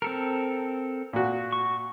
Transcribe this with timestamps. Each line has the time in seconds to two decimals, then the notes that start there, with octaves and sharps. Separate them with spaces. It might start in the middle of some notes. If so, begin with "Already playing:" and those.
0.02 C4 A4 A#4
1.13 A#2 F#4
1.52 C#6